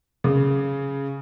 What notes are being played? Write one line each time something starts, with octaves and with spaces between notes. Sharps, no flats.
C#3